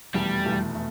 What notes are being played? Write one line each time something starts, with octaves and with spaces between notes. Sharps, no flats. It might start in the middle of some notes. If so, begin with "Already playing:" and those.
F1 E2 B2 G3 A3
F1 E2 B2 A3
A3